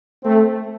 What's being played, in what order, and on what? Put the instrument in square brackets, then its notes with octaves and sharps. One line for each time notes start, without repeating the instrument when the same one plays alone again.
[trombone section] A3 C4